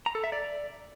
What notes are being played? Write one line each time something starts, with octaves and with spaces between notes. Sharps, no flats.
A#5
A4
E5
D5